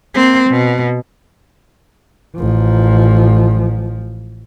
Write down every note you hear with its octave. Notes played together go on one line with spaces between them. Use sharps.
A#3 C4
B2
A1 F3